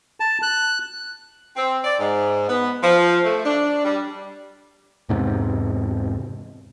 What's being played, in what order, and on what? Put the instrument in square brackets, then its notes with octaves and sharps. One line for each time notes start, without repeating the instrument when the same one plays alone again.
[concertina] A5
F#6
[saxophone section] C4
D5
G#2
B3
F3
A3
D4
G3
[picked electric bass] E2 G#2 C3